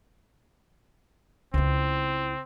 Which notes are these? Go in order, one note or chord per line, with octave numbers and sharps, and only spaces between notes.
C#2 C4 E4